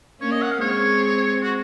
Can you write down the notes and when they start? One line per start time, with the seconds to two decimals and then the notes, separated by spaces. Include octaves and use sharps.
0.20 A#3 C#4 C#5
0.31 D#5
0.42 F#5
0.51 F5
0.61 G#3 C4 C#5
1.42 F#4